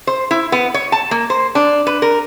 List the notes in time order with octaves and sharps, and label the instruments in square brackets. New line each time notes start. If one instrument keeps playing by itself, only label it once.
[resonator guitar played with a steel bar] C5
E4
B3
C#5
A5
A#3
C5
D4
B4
A#4